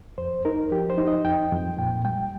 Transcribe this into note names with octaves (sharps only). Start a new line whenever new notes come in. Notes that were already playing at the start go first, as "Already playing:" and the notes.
F2 C5
D#4 A#4
F3 G4
C5
D#4
D#5
F2 G5
F2
A#2 G5
G3 G5